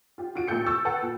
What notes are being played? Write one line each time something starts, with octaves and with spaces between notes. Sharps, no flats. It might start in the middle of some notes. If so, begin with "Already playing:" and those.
F4 G4
F4 F#4 D7
A1 A#2 G4 A4 G6 C#7
C#6 E6 G6 A6
A4 B4 F#5 G5 A5
A#2